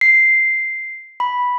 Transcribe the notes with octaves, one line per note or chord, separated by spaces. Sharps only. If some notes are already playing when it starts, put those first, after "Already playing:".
C7
B5